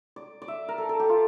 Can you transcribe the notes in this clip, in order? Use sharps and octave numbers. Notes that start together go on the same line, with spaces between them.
D5
D5
E5
A#4
A4
A4
G4
F4